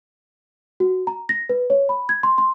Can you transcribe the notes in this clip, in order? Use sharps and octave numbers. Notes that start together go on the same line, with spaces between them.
F#4
A#5
A#6
B4
C#5
B5
G#6
C6
C6